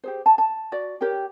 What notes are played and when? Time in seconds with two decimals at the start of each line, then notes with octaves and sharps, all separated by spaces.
0.04 G4 G#4 C5
0.26 A5
0.38 A5
0.72 F#4 D5
1.01 G4 A#4 C#5 G5